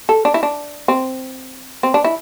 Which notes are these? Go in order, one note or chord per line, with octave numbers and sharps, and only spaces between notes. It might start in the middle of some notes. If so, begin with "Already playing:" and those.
A4
D4
E4
D4
C4
C4
D4
E4